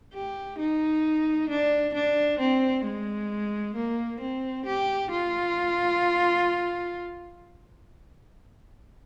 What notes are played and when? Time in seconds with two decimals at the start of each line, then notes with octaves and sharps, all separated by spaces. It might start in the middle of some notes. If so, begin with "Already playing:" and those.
0.14 G4
0.59 D#4
1.50 D4
1.94 D4
2.40 C4
2.84 G#3
3.76 A#3
4.20 C4
4.66 G4
5.11 F4